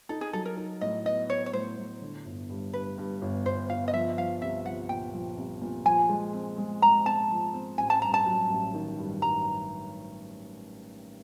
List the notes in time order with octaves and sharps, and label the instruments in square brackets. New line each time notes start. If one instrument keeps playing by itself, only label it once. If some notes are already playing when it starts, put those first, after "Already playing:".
[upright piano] D#4 [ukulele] A4
[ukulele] G#4
[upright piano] F#3 [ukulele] A4
[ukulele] A#4
[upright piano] D#4
[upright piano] A2 [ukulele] D#5
[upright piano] B3 [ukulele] D#5
[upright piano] B3 [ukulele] C#5
[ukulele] C#5
[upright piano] A2 [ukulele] C5
[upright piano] A2
D3
G1
G2
[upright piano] G2 [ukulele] B4
[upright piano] G2
G1
[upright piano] G1 [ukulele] C5
[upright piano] G1 [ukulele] F5
[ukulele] D#5
[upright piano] F3 [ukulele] E5
[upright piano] F3 [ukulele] F5
[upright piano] C2 [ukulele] E5
[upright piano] F3 [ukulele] F#5
[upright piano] A#2 [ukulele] G5
[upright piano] F3
C2
A#2
[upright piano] F3 [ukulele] G#5
[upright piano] G#3
C4
G#3
[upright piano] G#2 [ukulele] A#5
[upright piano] C4 [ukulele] A5
[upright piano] F3
C4
[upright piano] A1 [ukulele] G#5
[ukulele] A5
[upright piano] G2 [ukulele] A#5
[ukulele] A5
[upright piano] F#3
A1
D#3
G2
[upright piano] G2 [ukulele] A#5